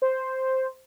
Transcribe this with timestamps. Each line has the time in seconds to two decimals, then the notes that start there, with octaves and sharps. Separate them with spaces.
0.02 C5